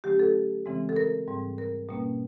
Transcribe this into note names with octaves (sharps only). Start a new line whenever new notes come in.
D3 F#3 A3 C#4 G4
A4
C#3 E3 G#3 C4
A4
A#4
G#2 E3 G3 C4
A#4
B2 G3 A#3 C#4